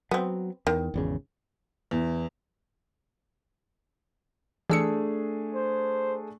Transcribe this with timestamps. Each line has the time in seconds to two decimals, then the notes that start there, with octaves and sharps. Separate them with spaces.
0.11 F#3 B3 C4
0.67 E2 D#3
0.94 G#1 E2 C#3
1.91 E2
4.70 E3 A3 D4 G#4 E6 C#7
5.55 C5